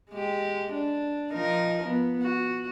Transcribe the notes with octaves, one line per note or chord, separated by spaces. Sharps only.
G#3 G4
D4
F3 D#4 A#4
B3
F#4